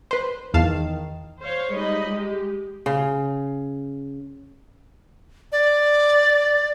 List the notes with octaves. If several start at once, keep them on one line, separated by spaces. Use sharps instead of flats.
B4 C5
E2 D#3 F5 A5
C5 C#5 F5
G3 G#3 D#4 D#5 B5
G#3 G4
C#3
D5